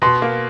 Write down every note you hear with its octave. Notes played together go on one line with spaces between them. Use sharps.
B2 C6
A#3